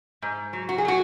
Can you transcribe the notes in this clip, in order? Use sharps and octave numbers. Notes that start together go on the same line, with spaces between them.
G#2
F#3
F#4
G#4
F#3 F#4